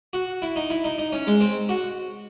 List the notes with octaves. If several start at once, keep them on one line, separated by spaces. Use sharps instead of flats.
F#4
E4
D#4
E4
D#4
D#4
C#4
G#3
C4
F#4